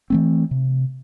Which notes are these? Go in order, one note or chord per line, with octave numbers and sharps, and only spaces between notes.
E3 A3 C4
C3